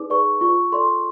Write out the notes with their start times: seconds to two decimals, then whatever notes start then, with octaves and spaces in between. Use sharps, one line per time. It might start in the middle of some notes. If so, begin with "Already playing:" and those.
Already playing: D#4 G#4 B4 D5 D6
0.10 G#4 B4 D5 C#6
0.41 F4 C#6
0.72 A4 D5 C6